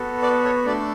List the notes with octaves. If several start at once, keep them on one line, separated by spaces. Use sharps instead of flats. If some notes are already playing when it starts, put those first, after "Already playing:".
Already playing: B3 F#4 A4
B4 D5
A4 C#5
A3 D4 A4 B4 D5